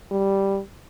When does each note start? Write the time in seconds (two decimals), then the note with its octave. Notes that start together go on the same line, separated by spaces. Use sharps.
0.11 G3